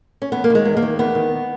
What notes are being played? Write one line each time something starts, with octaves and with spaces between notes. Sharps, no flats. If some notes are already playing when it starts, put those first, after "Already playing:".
C#4
E2 B3
A#3
D#3 G#3
E2
A#3
D#3
E2 B3
D#3